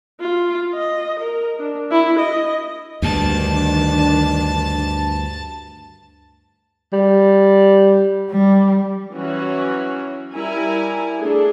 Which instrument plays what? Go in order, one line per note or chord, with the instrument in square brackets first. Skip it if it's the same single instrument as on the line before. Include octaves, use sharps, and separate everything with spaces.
[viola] F4
D#5
A#4
D4
E4
D#5
[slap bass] D2 G2 [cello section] D#3 D4 [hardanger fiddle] A5
[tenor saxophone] G3
[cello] G3
[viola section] E3 F#3 C#4 F#4 C#5
G3 E4 A#4 G#5 A#5
A3 D4 G#4 A4